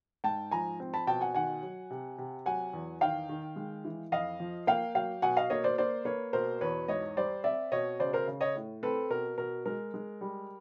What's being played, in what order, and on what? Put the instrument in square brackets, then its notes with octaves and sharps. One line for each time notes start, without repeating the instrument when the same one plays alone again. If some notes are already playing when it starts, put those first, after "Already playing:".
[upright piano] G#2 G5 A5
F3 G#5 A#5
C4
A5 B5
B2 G5 A5
F#5 G#5
D#3 F#5 G#5
F#3
C3
C3
F#3 F#5 G#5
E2
D#3 F5 G5
D#3
G#3
E3
F2 D#5 F5
F3
A#3 F5 G5
F#3 F5 G5
B2 F#5 G#5
D#5 F5
A#3 C#5 D#5
C5 D5
A#3 C5 D5
A#3 B4 C#5
B2 A#4 C5
E2 B4 C#5
G#2 C#5 D#5
G3 C5 D5
C4 D5 E5
B2 C#5 D#5
C#3 C5 D5
A#4 C5
C#3
C#5 D#5
A2
C4 A4 B4
B2 A#4
B2 A#4
G#3 A#4
G#3
G3